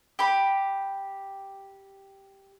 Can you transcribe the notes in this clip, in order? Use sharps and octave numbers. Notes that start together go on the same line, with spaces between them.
G4 B5